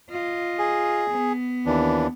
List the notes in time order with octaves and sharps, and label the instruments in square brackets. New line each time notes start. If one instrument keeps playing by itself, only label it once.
[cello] F4 D#5
[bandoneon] G#4
[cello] B3
[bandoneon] D#2 E3 D4